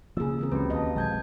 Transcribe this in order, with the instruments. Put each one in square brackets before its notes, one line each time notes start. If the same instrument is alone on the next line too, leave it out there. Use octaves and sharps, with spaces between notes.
[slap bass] C#3 F3 [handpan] A#3 G#4 [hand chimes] E6
[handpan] E3 C4 A#4
[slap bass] C#2 [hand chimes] C#4 F#4 G4 [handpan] B4
[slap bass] D#2 [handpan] D#5 [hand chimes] F5 A5
[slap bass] A#1 G#3 [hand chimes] A5 G6 G#6